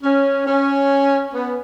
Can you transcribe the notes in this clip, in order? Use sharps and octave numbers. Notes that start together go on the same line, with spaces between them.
C#4
C#4
B3